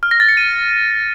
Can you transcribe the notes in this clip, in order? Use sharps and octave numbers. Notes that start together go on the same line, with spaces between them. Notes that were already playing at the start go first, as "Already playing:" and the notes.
F6
A#6
A6
C#7
D#7